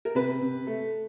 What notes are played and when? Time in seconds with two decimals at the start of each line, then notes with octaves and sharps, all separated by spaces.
0.05 A#4
0.15 C3 B4
0.41 C3
0.67 A3